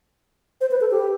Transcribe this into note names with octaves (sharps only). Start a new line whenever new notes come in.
C5
B4
A4
G4